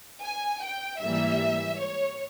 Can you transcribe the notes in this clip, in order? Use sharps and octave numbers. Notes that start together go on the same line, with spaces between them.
G#5
G5
G#2 E3 G3 A#3 E5
C#5